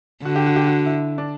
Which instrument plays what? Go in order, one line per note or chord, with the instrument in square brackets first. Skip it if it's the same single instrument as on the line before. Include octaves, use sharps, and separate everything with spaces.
[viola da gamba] D3 [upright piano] F#4
[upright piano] G4
F#4
G4
F#4
E4
D4